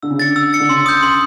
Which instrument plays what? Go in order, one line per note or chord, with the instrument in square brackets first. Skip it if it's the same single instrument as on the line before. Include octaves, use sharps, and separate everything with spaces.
[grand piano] D3 [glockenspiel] E6
[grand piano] C#3
[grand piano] D3 [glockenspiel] A6 C#7
[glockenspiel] E6
A6 C#7
[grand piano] D3
[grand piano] C#3 [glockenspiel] C6
[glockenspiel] D#6 G6
C6